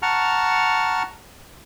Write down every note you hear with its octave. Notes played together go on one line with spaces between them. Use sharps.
F#5 A5 A#5 C#6 F6